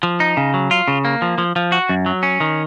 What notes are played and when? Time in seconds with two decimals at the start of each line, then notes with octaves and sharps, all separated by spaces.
0.03 F3
0.20 D#4
0.37 C#3
0.54 F#3
0.71 F4
0.88 C#3
1.05 A#3
1.22 F3
1.38 F3
1.56 F3
1.72 F#4
1.89 F#2
2.06 F#3
2.23 C#4
2.40 D#3